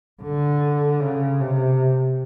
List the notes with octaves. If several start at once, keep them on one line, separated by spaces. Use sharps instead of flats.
D3
C#3
C3